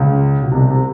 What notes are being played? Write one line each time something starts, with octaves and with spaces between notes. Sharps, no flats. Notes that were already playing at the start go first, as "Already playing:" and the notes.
Already playing: C#2 C#3
B2
C2 C3
C3